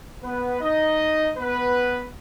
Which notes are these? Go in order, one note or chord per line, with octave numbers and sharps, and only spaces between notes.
B3 B4
D#4 D#5
B3 B4